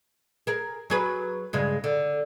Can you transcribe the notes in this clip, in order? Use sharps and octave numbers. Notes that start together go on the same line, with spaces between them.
G#4 A#4
F#3 G#4 B4
G2 C#3 G#3
D3